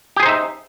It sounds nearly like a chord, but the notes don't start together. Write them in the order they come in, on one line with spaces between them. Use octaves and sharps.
G4 G#4 C5 D#4 E5